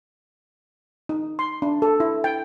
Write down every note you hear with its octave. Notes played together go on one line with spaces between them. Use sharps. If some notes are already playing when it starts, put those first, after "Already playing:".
D#4
C6
D4
A4
E4
G5